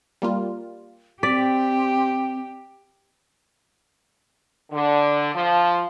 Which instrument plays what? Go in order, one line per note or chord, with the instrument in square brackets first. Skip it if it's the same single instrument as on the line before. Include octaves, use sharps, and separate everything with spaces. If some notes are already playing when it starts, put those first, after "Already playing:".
[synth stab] G3 A#3 F4
[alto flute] C4 [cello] G4 [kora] D5 [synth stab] B6
[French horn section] D3
F3